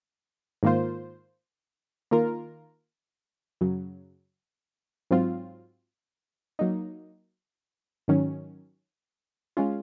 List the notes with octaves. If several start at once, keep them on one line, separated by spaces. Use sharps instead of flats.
G#2 D#3 A#3 F4 C5
D#3 A#3 F4 A#4
F#2 C#3 F#3
G#2 F#3 C4 F4
F#3 A#3 D#4
G#2 D#3 F#3 C#4
G#3 C#4 F4